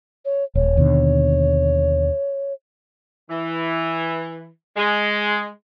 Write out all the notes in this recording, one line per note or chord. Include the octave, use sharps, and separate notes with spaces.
C#5
D#1 C#5
D#2 B2 D3
E3
G#3